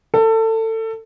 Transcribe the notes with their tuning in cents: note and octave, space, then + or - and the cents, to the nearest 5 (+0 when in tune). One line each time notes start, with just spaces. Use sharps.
A4 +25